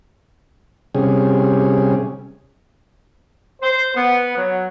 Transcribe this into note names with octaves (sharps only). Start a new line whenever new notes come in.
C3 G3 C#4 G#4
C5
B3
F#3